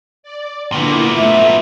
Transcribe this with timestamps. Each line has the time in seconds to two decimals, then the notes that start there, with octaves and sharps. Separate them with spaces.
0.23 D5
0.72 A#2 D3 A#3 B3 E4
1.17 A3 E5